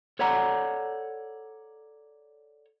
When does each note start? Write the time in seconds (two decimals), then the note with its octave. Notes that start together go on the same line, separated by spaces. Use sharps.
0.19 A4 C#5 D5 F#5 A#5